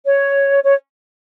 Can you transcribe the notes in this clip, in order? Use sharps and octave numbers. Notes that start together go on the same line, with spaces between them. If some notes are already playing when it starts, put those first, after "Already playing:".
C#5
C#5